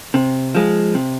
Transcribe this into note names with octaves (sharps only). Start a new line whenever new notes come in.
C3
F3 G#3
C3